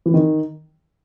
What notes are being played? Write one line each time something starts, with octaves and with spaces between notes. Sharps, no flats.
E3
D#3